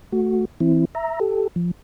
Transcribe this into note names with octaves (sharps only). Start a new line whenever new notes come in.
A3 F#4
E3 C4 E4
E5 A#5
G4 A4
F3